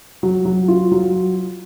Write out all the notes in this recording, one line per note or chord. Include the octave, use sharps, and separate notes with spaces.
F#3
F#3
F4
F#3